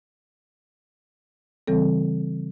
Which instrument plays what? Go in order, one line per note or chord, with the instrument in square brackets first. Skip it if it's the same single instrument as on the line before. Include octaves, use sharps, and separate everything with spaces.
[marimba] C#3 E3 G3 C4 A4